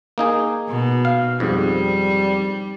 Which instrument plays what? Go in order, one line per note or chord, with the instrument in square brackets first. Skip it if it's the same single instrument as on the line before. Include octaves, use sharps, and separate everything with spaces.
[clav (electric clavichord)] A#3 D#4 G#4
[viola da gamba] B2
[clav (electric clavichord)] F5
[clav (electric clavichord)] F2 G#2 [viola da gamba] G3